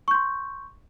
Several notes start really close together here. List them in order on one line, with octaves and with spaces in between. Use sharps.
C#6 G6 C6